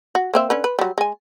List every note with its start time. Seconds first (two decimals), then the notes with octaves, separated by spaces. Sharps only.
0.15 F#4
0.34 A#3 C4 E5
0.50 D3 C#4 B4
0.64 B4
0.79 F#3 G3
0.98 G#3 G#5